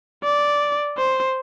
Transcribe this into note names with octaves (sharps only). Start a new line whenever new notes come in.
D5
C5